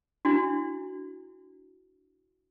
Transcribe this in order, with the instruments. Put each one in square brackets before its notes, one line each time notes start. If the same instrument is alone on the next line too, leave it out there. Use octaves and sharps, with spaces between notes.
[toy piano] D4 E4 F#4